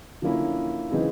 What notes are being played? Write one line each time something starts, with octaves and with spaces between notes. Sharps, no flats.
D3 F3 A#3 C#4 E4
C#3 E3 G#3 C4 D#4